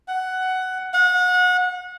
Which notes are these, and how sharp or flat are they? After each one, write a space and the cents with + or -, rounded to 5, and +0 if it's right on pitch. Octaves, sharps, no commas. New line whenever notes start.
F#5 +10
F#5 -30